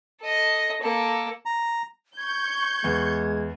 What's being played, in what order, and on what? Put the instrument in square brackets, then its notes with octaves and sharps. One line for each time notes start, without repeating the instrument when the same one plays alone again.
[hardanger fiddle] A4 D#5
A#3 A4
[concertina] A#5
[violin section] C#6 G6 [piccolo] G#6
[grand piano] E2 [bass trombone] G#3